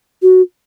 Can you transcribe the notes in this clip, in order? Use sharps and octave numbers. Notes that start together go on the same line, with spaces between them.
F#4